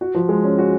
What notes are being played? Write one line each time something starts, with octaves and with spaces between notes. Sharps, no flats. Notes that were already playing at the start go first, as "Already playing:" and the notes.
F#4
F3
G#3
C#4
F#4